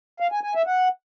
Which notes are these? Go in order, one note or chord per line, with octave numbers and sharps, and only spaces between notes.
F5
G#5
G#5
E5
F#5